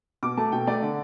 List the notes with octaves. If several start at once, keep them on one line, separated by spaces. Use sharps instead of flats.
B2 D6
A3 A5
B2 G5
A3 D5
D3